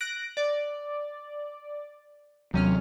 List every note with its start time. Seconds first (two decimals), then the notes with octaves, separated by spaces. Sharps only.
0.01 F#6 A#6 D7
0.37 D5
2.54 D#2 C3 F#3 C#4 F6